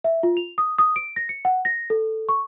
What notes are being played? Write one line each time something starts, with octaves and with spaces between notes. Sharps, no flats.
E5
F4
F7
D#6
D#6
D7
A#6
C#7
F#5
A#6
A4
C#6